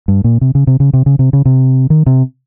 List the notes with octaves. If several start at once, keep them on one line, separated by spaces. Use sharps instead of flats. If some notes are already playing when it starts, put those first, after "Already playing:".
G2
A#2
C3
C#3
C3
C#3
C3
C#3
C3
C#3
C3
D#3
C3